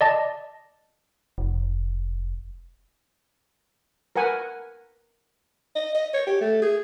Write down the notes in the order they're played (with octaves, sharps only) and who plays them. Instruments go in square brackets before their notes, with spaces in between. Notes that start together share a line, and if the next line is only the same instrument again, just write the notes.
[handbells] D5 D#5 A5
[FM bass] F1
[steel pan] A#4 B4 F#5 G#5
[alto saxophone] D#5
D#5
C#5
G4
A3
G#4